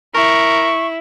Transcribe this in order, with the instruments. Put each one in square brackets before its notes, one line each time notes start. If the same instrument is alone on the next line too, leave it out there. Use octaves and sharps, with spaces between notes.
[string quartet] E4 [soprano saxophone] A#4 [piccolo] C#6